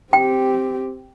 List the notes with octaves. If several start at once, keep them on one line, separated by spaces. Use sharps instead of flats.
C4 G4 G5